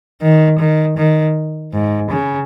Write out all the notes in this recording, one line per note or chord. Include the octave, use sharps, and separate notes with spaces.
D#3
D#3
D#3
G#2
C#3